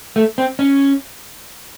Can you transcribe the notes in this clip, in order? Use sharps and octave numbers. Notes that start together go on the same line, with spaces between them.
A3
C4
C#4